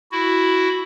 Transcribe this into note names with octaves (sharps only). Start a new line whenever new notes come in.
E4 F#4